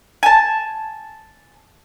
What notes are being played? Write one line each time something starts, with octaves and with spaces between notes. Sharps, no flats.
G#5 A5